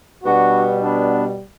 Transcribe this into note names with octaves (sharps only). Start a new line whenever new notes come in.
B2 G3 B3 D4 F#4
B3 D4